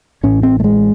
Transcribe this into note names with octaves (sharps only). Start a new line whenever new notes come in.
A1 A2 C#4
C4
A3
G#3